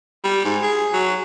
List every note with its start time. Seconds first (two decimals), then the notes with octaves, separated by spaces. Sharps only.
0.24 G3
0.45 G#2
0.62 G#4
0.93 F#3